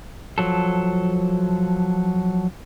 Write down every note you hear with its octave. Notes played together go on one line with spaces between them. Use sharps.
F3 F#3 A4